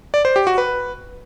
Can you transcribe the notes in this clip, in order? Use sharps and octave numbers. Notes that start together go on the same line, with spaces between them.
D5
C5
G4
F#4
B4